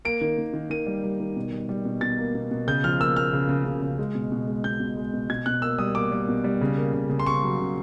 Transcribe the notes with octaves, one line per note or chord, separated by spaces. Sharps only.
A#3 D7
D#3
D#3
D#3
D#3 D#7
G3
G3
D#3
B2
G3
G3
B2
B2 A6
A#3
B2
B2
C#3 G6
F3 F6
A#3 E6
A#3 F6
C#3
C#3
C#3
C#3
G#3
B2
B2
G#3
B2 G6
B2
G#3
B2
B2 G#6
B2 F#6
A#3 E6
G3 D#6
A#3 D6
G3
B2
G3
C#3
A#3
C#3
C#3
C6
C#3 C#6
F#3
C#3